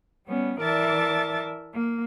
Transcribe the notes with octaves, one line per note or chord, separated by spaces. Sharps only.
G3 B3 C#4
E3 A#4 D5 E5 A5 A6
A#3